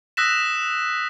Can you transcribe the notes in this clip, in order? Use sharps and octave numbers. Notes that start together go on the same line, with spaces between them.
D#6 E6 F#6 A#6 B6 E7